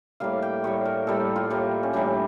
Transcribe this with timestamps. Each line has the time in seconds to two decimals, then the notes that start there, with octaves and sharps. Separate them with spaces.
0.20 A2 G3 A#3 F5
0.42 G5
0.64 A2 G3 A#3 C#5
0.85 A#4
1.07 A2 G3 A#3 A4
1.36 F4
1.50 A2 G3 A#3
1.83 C#4
1.93 A2 E3 G3 A#3 D4